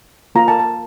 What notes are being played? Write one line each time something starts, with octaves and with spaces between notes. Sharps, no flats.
A#3 F4 A#5
A5
A5